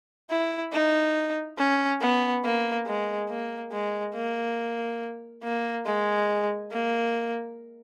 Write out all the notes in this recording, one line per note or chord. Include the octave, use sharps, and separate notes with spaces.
E4
D#4
C#4
B3
A#3
G#3
A#3
G#3
A#3
A#3
G#3
A#3